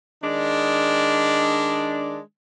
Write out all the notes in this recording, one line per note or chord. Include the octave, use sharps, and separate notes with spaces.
D#3 G#3 D4